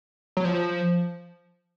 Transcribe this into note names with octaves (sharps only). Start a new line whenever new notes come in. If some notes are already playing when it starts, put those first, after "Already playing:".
F#3
F3